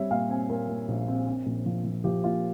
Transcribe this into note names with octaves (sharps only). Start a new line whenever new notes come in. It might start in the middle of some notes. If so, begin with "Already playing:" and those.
Already playing: G3 C4 C#5 E5
A#2 F5
C4 G#5
A#2 A#4
A#2
A#1
C4
C4
A#1
F3
F3
F3 G4
A#2 F4